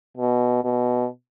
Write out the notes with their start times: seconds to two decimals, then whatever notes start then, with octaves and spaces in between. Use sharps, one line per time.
0.17 B2
0.64 B2